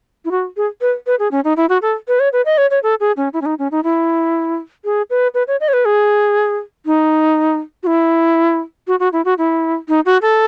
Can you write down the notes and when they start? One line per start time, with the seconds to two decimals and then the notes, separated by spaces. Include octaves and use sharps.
0.25 E4
0.31 F#4
0.57 G#4
0.81 B4
1.06 B4
1.19 G#4
1.31 C#4
1.44 D#4
1.57 E4
1.69 F#4
1.82 A4
2.08 B4
2.20 C#5
2.33 B4
2.45 D#5
2.58 C#5
2.70 C#5
2.83 A4
3.00 G#4
3.17 C#4
3.33 E4
3.41 C#4
3.46 D#4
3.59 C#4
3.71 D#4
3.84 E4
4.85 G#4
5.10 B4
5.34 B4
5.48 C#5
5.60 D#5
5.68 C#5
5.73 B4
5.85 G#4
6.86 D#4
7.83 F#4
7.87 E4
8.87 F#4
9.00 F#4
9.13 E4
9.25 F#4
9.38 E4
9.88 D#4
10.06 F#4
10.22 A4